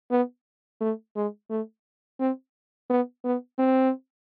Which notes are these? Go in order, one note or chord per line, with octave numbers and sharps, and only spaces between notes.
B3
A3
G#3
A3
C4
B3
B3
C4